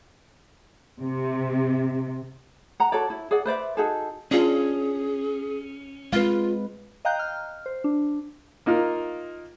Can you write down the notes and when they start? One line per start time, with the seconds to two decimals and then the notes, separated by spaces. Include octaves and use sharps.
1.02 C3
2.80 F#5 A#5
2.92 F#4 A4 C#5 D5
3.10 E4
3.31 G#4 D5 F#5
3.46 B4 C5 D5 E5
3.77 D#4 F#4 G#4 A4
4.31 C#4 D4 F4 G#4
6.13 G#3 C4 F4 B4 F5
7.05 D#5 F5 G5 A#5 F#6 G6
7.19 F6
7.66 C5
7.84 D4
8.66 A#3 D#4 F4 A#4